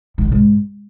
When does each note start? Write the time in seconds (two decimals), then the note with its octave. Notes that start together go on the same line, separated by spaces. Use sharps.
0.18 A2
0.25 C3
0.32 G#2